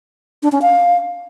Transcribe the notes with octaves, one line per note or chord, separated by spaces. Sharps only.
D4
C#4
F5